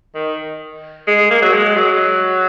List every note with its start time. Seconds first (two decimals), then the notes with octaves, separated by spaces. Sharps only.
0.15 D#3
1.07 G#3
1.30 A#3
1.42 F#3
1.53 G#3
1.77 F#3